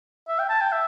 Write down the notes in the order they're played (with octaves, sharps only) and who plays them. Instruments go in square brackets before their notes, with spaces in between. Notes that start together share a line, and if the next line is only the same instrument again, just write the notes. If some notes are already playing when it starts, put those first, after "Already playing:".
[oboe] E5
G5
A5
G5
E5